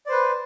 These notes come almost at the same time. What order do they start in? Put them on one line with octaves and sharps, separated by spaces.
D5 C5 B4